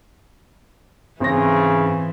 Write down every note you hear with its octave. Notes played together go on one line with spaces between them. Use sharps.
G#2 C#3 E3 C4 A#6